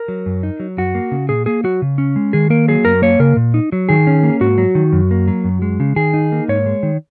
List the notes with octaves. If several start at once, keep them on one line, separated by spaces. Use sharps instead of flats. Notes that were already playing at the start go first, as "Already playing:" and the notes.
Already playing: A#4
F#3
F#2
D#4
F#3
F#2 F#4
A#3
C#3
A#2 G#4
A#3 G#4
F#3 F#4
C#3
C#4
G#3
D#3 G#4
A#3 A#4
F#3 G#4
F#2 A#4
A#3 C#5
C#3 A#4
A#2
D#4
F#3
D#3 G#4
C#4
A#3
G#2 F#4
F#3
D#3
F#2
A#3
F#3
F#2
G#3
C#3
D#3 G#4
D#4
A#3
G#2 C#5
G#3
D#3